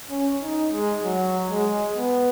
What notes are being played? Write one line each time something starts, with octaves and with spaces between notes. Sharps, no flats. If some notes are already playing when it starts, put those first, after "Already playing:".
C#4
D#4
G#3
F#3
G#3
B3